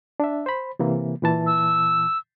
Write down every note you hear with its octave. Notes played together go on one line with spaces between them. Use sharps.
D4 E5
C5 B5
C3 E3 A#3
A#2 E3 A5
E6